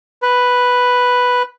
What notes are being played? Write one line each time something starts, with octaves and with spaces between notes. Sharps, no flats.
B4